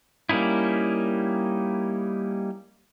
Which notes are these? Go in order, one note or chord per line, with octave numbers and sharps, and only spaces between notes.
G3 A#3 C#4 D#4 E4